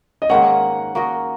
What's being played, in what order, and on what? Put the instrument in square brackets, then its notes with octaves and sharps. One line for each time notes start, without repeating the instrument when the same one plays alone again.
[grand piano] D#5
[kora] G#2 D#3 A#3 C#4 [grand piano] F#5
[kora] A#3 F#4 D#5